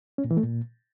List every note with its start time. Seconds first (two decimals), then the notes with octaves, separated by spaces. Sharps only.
0.18 C#4
0.24 A#2
0.31 E3
0.37 A3
0.43 A#2